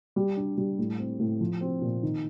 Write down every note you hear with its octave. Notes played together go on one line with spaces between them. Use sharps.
G3
D4
G3
A2
C4
A2
F3
C4
A#2
D#3